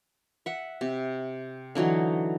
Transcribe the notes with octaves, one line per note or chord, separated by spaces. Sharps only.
E5 F#5
C3
D3 E3 F#3 D#4